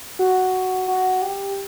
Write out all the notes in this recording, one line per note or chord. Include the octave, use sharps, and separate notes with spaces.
F#4
F#4
G4